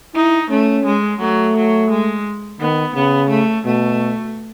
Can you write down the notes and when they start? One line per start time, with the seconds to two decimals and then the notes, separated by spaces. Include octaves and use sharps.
0.15 D#4 E4
0.50 A3 C#4
0.86 G#3
1.20 F#3 A3
1.56 F#3
1.90 G#3
2.60 D#3 B3
2.95 C#3 B3
3.30 A3
3.65 B2 A3